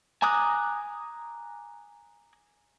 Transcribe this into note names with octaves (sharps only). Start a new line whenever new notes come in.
G#5 A#5 D6 D#6 F#6